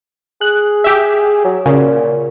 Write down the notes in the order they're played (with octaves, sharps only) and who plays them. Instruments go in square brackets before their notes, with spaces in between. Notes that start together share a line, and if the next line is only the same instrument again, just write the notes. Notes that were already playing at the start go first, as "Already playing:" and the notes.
[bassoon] G#4 [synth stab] F#6
[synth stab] G4 E5
[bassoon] F#3
[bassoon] A#2 [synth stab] C#3